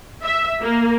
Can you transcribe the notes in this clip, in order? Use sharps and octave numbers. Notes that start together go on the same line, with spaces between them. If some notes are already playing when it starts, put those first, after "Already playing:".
E5
A#3